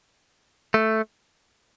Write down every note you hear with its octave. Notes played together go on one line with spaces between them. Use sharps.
A3